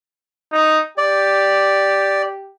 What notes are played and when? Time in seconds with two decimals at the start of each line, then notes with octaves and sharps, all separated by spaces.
0.52 D#4
0.98 G4 D5